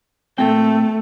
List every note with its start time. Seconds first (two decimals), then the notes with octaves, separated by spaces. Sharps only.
0.38 A#2 A3 C4 G5